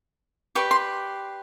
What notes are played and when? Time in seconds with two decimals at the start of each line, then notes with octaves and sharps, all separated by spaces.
0.55 G4 B4 D5 C#6
0.71 C6